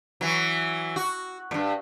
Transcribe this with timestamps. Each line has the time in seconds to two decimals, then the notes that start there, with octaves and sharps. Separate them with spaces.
0.21 E3 F#3
0.96 F#4
1.51 G2 A#2